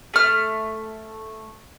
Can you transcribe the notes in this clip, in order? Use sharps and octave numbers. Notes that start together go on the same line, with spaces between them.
A3 F6